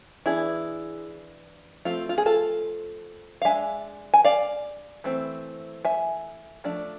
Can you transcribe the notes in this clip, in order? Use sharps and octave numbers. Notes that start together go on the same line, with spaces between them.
E3 B3 D4 E4 G#4
F3 A3 C4 F4
F4
G#4
F4 A4
F5
G#3 D4 E5 G#5
G#5
D5 F5
E3 A3 C4
E5 G#5
F3 A3 D4